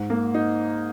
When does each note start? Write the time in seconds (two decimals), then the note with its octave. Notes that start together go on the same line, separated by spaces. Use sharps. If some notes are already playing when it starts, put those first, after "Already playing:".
Already playing: G#2
0.10 A#3
0.34 D#4